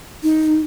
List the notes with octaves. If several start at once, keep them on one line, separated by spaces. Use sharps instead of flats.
D#4